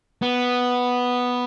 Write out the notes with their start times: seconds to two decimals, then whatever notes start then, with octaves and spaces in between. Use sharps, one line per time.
0.23 B3